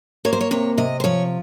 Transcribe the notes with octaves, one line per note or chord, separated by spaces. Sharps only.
A#3 C#5
C5
C#5
C3 C#5
C3 D#5
C5
F3 C#5